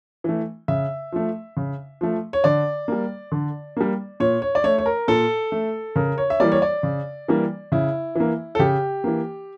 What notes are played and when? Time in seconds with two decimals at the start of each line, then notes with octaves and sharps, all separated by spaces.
0.24 E3 A3
0.68 C#3 E5
1.12 F3 A3
1.57 C#3
2.01 F3 A3
2.33 C#5
2.44 D3 D5
2.88 G3 A#3
3.32 D3
3.77 G3 A#3
4.20 A#2 C#5
4.42 C#5
4.55 D5
4.64 A3 C#5
4.78 C#5
4.86 A#4
5.08 A#2 A4
5.52 A3
5.96 C#3 A#4
6.18 C#5
6.30 E5
6.40 E3 G3 A#3 D5
6.52 C#5
6.62 D5
6.83 C#3
7.28 E3 G3 A#3
7.72 C#3 E4
8.15 E3 A#3
8.55 A4
8.59 C#3 G4
9.04 E3 A#3